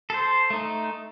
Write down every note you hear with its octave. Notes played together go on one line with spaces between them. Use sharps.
A4 C5
A3 D#4